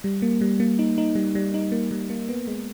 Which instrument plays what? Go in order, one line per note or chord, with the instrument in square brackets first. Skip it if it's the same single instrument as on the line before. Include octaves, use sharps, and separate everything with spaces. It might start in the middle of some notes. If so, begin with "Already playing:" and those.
[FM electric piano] G3
A#3
G3
A#3
D#4
D#4
G3
G3
D#4
A#3
G3
A#3
B3
G#3